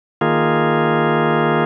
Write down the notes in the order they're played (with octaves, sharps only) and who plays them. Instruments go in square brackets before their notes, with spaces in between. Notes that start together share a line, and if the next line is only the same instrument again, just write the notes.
[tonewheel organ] D#3 A#3 F4 G#4